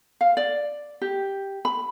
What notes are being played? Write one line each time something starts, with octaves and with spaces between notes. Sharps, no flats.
F5
D5
G4
B5